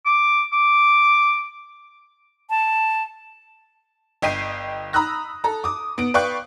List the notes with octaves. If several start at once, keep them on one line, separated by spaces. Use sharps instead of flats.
D6
D6
A5
G1 D#5 G5 B6 C7 D#7
A#5 B5 D#6 E6 F#6 A#6
A4 A#5
D6 D#6
B3 D7
B4 D5 F5 G5 C#6 F#6